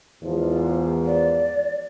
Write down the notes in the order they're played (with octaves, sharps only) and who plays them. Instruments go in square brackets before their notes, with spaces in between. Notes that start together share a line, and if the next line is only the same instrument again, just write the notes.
[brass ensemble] E2 G#2 F3
[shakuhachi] D5